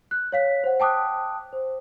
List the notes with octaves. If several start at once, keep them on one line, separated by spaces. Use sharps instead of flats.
F#6
C#5 F5 B6
C5 F#5
G5 A5 D6 D#6 F#6
C5